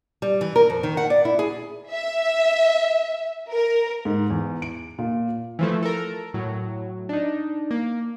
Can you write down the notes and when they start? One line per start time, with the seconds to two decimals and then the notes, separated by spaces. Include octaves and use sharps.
0.22 G3
0.41 E3
0.56 A#4
0.70 F2
0.83 D#3
0.97 F#5
1.10 D5
1.25 E4
1.39 G#4
1.91 E5
3.50 A#4
4.05 G#2
4.30 E2
4.62 D7
4.98 A#2
5.59 E3 F3 A3
5.82 A4 A#4
6.34 A2 F#3
7.09 D4 D#4
7.71 A#3